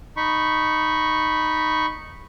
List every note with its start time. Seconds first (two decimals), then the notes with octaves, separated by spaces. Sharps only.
0.17 D#4 B5 C#6